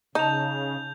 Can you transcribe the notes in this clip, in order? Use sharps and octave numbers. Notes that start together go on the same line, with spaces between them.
C#3 D#4 A5 G6 F7